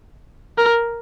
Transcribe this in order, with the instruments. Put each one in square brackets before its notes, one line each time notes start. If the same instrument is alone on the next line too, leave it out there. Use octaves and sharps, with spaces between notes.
[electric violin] A#4